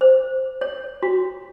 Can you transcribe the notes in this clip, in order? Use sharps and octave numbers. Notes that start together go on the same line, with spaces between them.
C5
C#5
F#4